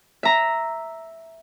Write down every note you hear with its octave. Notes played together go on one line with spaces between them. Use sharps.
E5 A#5